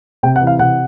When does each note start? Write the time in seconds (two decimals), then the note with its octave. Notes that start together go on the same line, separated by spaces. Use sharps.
0.23 C3 G5
0.36 F#5
0.42 E3
0.47 F5
0.59 C3 F#5